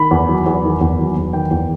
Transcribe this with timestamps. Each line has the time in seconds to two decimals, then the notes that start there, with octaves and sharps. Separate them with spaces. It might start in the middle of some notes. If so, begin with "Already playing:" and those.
Already playing: D#3 B5
0.11 E2
0.29 F#3
0.46 E2
0.63 D#3
0.81 E2
0.99 F#3
1.16 E2
1.33 D#3 G5
1.51 E2